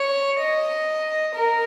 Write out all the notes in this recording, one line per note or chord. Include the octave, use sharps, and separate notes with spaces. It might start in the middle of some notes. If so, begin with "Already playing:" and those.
Already playing: C#5
D#5
A#4